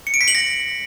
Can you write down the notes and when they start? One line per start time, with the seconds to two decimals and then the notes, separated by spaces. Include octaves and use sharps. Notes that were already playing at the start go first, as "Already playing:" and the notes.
0.07 C#7
0.14 D7
0.21 B6
0.28 F#7
0.35 A#6